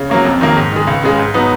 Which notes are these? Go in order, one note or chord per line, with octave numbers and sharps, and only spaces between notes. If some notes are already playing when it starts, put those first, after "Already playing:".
Already playing: C#3
F#3 A#3 C#4
F2
D#3 F#3 A#3
G#2
D#3 G#3
C#2
C#3 G#3
G#2
F#3 B3 D#4